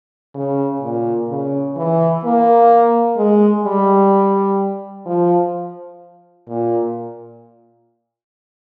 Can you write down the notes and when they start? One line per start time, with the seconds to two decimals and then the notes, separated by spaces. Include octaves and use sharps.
0.35 C#3
0.82 A#2
1.29 C#3
1.76 E3
2.24 A#3
3.17 G#3
3.64 G3
5.06 F3
6.47 A#2